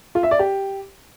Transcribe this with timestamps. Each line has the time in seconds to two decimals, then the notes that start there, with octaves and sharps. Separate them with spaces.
0.15 F4
0.23 E5
0.31 D5
0.39 G4